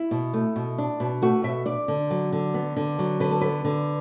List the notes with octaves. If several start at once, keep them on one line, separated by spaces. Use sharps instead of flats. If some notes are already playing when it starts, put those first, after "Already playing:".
Already playing: E4
B2
A3
B2
D4
B2
A3 F#4
B2 E5
D4 D5
D3
F#3
D3
B3
D3
F#3
D3 B4
A4
B3 B4
D3